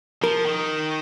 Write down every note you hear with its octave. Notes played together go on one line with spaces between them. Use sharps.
F3 A#4
D#3